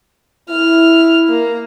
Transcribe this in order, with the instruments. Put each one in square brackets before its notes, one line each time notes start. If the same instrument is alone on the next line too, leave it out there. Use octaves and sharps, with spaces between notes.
[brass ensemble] E4 [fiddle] F6
[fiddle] A#3